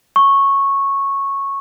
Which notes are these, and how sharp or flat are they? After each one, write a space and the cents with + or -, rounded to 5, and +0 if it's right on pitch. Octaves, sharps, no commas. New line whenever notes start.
C#6 -10